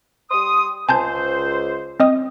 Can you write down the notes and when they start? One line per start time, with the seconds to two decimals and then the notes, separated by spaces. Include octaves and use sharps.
0.31 G3 C6 D#6
0.89 C#2 C5 G#5 A5 G6
2.00 C4 D#5 D#6